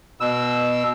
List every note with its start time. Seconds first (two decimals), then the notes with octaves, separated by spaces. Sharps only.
0.20 B2 E6